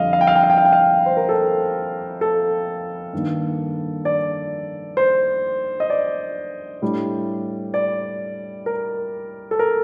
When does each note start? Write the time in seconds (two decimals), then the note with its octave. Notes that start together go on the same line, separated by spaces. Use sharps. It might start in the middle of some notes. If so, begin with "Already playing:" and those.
Already playing: F2 D3 G3 D4 D#5 F5
0.13 F5
0.21 G5
0.27 F5
0.35 G5
0.43 F5
0.50 G5
0.58 F5
0.65 G5
0.73 F5
1.06 C5
1.17 A#4
1.29 A4
2.21 A4
3.13 G2 D#3 A#3
4.05 D5
4.97 C5
5.80 D#5
5.90 D5
6.82 A2 G3 D4
7.74 D5
8.66 A#4
9.51 A4
9.59 A#4